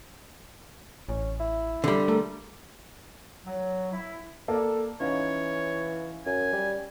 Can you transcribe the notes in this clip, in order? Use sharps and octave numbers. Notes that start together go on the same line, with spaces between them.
A1 C#4
E4
D3 G3
A3 A#4
F#3
E4
A#3 A4 D5
E3 C#4 D#4 C#5 F5
F#2 G#5
G3